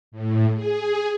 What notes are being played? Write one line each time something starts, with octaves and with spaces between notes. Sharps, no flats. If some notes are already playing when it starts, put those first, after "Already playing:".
A2
G#4